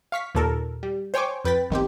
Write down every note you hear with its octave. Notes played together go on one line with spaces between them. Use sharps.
F5 C#6 B6
D#2 A#2 A4 A#4
G3
C5 C#5 G5 G#5 C#6 D6
F2 B4 G5 A6 B6
G1 D#3 C4 G4